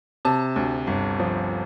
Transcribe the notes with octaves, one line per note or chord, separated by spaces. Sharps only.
C3 A5
D2
G1
F3